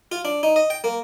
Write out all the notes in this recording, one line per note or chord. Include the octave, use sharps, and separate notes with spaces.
F4
D4
D#4
D#5
G5
A#3